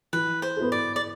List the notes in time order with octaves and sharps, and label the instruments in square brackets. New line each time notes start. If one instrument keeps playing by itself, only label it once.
[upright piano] E3 [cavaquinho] B4
[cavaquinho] C5
[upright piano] B3 E4 A4
[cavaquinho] D5
D5